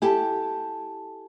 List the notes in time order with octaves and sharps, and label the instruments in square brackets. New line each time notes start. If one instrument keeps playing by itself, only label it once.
[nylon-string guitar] E4 G4 A4 [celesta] G#5 A5